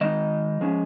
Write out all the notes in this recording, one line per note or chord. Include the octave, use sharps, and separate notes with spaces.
D#3 G#3 D#4 D#5
F3 G#3 C#4